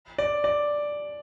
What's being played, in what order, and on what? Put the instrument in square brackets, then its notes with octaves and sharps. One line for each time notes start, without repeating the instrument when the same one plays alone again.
[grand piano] D5
D5